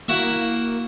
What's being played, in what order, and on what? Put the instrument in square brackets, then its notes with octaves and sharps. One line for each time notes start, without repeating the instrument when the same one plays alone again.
[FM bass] A#3 [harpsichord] E4 F#4 E5